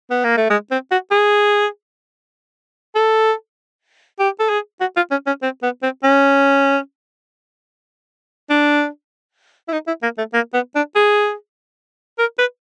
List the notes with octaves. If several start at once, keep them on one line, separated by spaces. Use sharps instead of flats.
B3
A#3
A3
G#3
C4
F#4
G#4
A4
G4
A4
G#4
F#4
F4
C#4
C#4
C4
B3
C4
C#4
D4
E4
D#4
E4
A#3
A3
A#3
B3
D4
G#4
A#4
B4